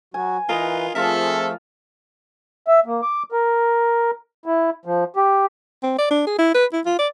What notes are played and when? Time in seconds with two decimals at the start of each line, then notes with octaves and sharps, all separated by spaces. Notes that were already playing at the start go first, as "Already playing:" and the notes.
0.14 F#3 F#4 G#5
0.49 E3 F4 A#4 B4 D#5 A#5
0.95 F3 A3 C4 F4 G#4 A4 E5 F5
2.68 E5
2.86 A#3
3.02 D6
3.32 A#4
4.46 E4
4.86 F3
5.16 G4
5.83 C4
5.98 D5
6.10 D4
6.27 G#4
6.39 E4
6.54 B4
6.73 E4
6.86 F4
6.99 D5